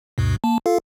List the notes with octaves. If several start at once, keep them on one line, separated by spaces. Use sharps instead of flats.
D2 G2 B2
A#3 A5
F4 A4 F5